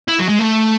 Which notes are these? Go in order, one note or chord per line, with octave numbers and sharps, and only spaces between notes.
E4
F#3
G#3
A3